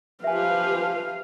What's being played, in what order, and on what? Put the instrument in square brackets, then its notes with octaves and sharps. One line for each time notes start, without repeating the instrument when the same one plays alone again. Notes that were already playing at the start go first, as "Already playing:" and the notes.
[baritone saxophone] F3 [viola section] G4 B4 [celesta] E5 G#5 [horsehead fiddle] F5